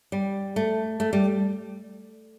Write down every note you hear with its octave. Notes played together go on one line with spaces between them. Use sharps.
G3
A3
A3
G3